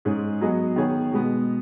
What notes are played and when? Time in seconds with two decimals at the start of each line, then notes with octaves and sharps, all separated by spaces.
0.05 G#2 G#3 C#4 G#4
0.41 F#3 B3 G#4 D#5
0.76 D#3 B3 G#4 C#5
1.12 B2 G#3 B3